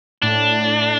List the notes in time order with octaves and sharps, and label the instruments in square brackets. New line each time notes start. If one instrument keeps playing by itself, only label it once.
[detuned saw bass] A2 [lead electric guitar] D4